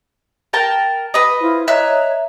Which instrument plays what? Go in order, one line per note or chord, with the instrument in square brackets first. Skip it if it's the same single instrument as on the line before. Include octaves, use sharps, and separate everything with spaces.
[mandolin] A#4 G5 A5
B4 D#5
[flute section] E4 F4 C5
[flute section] C#5 D#5 A#5 [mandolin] E5 F#6